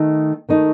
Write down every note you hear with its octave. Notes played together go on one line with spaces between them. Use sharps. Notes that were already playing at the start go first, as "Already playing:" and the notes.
Already playing: D#3 A3 D#4
D#3 A3 D#4